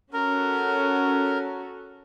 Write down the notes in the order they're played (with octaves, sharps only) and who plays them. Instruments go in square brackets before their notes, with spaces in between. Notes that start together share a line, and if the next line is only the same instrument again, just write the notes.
[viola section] C#4 F#4 A4 [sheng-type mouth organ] A#4